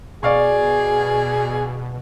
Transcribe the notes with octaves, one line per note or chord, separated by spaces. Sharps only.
B2 G#4 D5 F5 C#6